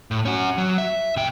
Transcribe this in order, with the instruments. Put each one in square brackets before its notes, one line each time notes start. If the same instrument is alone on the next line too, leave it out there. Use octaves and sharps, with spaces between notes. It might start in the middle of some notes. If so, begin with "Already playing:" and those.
[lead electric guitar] A2
C#4 F#4
F#3
E5
B2 G5